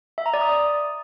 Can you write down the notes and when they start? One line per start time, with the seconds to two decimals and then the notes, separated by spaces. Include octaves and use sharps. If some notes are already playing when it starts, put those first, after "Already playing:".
0.18 E5
0.26 A#5
0.34 D5
0.41 D#6